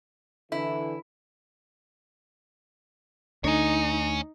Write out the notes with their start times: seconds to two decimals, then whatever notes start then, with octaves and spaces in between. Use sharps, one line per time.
0.52 D3 E3 E4
3.44 D2 D3 D#4 C#5 G#5